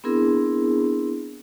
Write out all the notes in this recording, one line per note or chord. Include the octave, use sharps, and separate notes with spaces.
B3 C4 D4 E4 G#4 A#4